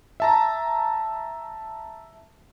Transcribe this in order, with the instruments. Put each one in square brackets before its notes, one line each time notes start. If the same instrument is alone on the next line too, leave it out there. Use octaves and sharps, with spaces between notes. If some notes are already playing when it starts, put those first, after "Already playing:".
[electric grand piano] E5 A5 A#5